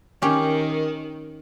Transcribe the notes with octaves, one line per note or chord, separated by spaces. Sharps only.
D#3 C#4 G4 A#4